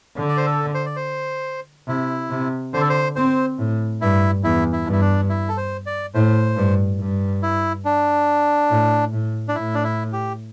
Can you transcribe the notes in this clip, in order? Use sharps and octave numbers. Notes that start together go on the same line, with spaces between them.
D3
D5
C5
A4
C5
D5
C5
C3 E4
C3
D3 C5
A4
C5
C4 C5
A2
G2 E4
E2 E4
E4
G2
E4
D4
E4
A4
C5
D5
A2 C5
G2
G2
E4
D4
A2
A2
D4
A2 E4
D4
E4
G4